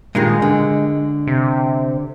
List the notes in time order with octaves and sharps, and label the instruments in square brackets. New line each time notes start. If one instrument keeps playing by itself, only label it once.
[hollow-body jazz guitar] G2 A#2 D#3 [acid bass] G#3
[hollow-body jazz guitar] D3
[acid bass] C3